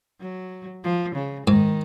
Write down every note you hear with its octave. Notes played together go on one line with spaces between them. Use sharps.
F#3
F3
C#3
G#2 D#3